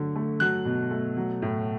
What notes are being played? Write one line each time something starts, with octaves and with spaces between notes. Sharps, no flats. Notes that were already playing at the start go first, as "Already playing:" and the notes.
Already playing: D3 F#3 A3
A3
F#3 F#6
B2
A3
F#3
A2